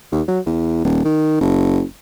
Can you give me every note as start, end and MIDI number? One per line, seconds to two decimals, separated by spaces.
0.12 0.22 39
0.28 0.40 54
0.46 0.84 40
0.85 1.03 27
1.05 1.40 51
1.41 1.82 30